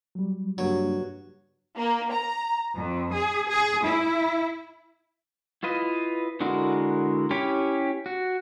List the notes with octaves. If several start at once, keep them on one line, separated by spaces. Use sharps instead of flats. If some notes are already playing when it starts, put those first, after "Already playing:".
F#3 G3
G2 C#3 F#3 A#3 G#6
A#3
A#5
F2
G#4
G#4
E4
E4 F4 B4 D#5
D3 G#3 E4 F#4 A#4
C#4 E4 G4 C#5
F#4